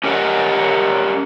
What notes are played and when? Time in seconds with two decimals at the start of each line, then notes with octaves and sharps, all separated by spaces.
0.04 C#4 G4 A#4 D#5 F#5